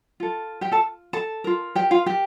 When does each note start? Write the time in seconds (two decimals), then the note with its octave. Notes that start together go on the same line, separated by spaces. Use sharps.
0.20 F4 A4
0.61 G4 G5
0.72 A4 A5
1.13 A4 A5
1.44 F4 A#4
1.75 G4 G5
1.91 F4 F5
2.06 G4 G5